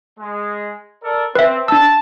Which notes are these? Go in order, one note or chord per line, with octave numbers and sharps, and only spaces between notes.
G#3
A4 A#4 D5
C4 B4 E5
D4 A5 E6